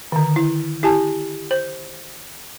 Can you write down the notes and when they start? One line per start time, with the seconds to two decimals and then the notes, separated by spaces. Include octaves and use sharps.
0.12 D3 D#3
0.36 E4
0.83 E4 G4 G#5 A5
1.51 C5